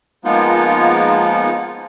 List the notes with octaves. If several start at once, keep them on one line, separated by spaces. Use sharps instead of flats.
F3 G#3 A#3 B3 D#4 F4